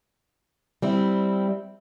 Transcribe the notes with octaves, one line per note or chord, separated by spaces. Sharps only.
G3 C4 E4